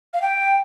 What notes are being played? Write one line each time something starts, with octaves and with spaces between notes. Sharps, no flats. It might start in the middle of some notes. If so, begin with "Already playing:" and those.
F5
G5